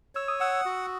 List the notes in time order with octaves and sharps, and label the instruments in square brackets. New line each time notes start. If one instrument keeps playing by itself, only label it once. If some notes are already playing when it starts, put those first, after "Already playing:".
[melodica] C#5 [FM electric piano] E6
[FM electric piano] D#6
[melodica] F#5 [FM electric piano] E6
[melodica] F#4